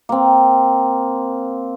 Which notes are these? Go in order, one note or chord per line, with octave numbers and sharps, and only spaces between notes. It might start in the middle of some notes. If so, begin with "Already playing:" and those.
A#3 C4